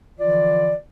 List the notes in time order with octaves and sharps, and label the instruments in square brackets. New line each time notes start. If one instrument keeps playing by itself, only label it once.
[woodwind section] D3 E3 F3 F4 D5